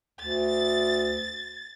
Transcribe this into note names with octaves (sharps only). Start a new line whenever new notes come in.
D2 A6